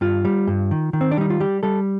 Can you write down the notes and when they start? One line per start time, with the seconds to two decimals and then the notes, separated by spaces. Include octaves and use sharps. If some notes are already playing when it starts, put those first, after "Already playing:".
0.01 G2 F4
0.25 G3
0.47 G2
0.71 D#3
0.93 D#3
1.01 C4
1.11 D4
1.18 G3 D#4
1.30 F4
1.40 G3 G4
1.63 G3 A4